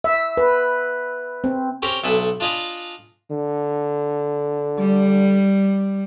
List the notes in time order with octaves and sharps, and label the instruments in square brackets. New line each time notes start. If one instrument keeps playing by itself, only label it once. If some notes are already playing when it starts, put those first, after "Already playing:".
[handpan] E5
B4
C4
[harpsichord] C4 C#4 G4 A#4
B1 D4 A4 E5 G#5 B5
D4 F4 D#5 F5 G#5 B5
[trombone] D3
[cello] G3